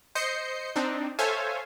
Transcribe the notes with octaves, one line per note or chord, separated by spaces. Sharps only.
C5 D#5 G6 C7 C#7
C4 D4 D#4
A4 C5 C#5 E5 F5 G#5